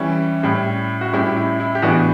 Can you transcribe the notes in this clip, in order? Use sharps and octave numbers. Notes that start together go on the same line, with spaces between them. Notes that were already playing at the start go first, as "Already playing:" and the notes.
Already playing: E3 G3 C#4 E4
A2 G3 C#4 E4
F#4
A2 G3 C#4 E4 G4
E4
E4
G4
A2 E3 B3 D4 F#4